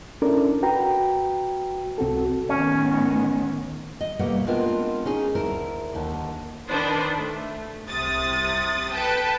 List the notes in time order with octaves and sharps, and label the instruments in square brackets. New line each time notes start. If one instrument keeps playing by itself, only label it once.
[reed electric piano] C#4 D4 E4 A4 A#4 D5
F#4 B4 G5 A#5
C2 C4 F#4 A4
[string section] A2 D#3 B3 [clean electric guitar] C#4
[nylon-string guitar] D#5
B2 G3 A3 A#3 F#5
G#3 B3 C4 D4 F4 A#4
C#4 D#4 G#4
D2 E4 A#4
D#2 D3
[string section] D#3 D4 D#4 B4 C5
A3
C2 C3 D#6 A6
A4 B4 G5 A5